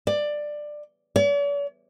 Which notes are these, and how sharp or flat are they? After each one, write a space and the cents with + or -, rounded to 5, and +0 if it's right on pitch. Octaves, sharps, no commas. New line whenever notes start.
D5 +15
D5 -45